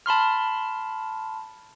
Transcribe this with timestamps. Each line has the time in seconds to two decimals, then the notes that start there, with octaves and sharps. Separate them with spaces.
0.06 A5 B5 C6 F6